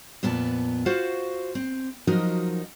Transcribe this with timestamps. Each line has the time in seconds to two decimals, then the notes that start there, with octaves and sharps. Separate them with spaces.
0.23 F2 A#2 B3 B4 A5
0.86 F4 F#4 C5 F5 F#5
1.55 C4
2.07 F3 F#3 D#4 F#4 A#4 D#5